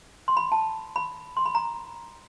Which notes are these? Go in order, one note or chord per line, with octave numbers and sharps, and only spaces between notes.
C6
B5
A5
B5
C6
B5
A#5